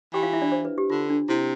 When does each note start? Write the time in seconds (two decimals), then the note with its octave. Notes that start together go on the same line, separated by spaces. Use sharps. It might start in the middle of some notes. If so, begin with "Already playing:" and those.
0.13 E3 G4 G5
0.23 F4 F5
0.33 E4 E5
0.42 D4 D5
0.52 C5
0.65 B4
0.78 G4
0.90 D3 F4
1.10 D4
1.29 C3 E4